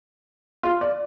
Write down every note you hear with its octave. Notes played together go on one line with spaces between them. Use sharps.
F4
D5